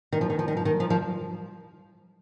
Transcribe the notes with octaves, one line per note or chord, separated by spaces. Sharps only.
D#3
F3
D#3
F3
D#3
F3
D#3
F3
F3